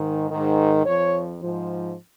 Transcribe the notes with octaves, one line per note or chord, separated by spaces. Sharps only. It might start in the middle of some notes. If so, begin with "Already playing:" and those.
Already playing: G#2 D#3
G#2 D#3
F2 F3 C#5
G#2 F3